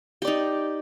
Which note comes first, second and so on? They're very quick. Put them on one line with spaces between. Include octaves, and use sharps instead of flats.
G4 D5 D#4